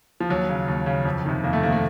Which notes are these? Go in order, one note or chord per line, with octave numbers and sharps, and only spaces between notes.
F3
D#2 F#3
C#3
D#2
C#3
F2
C3 D#3
F2 A#3
A3
C3 D#3 A#3
A3